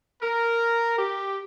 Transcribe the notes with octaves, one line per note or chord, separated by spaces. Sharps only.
A#4
G4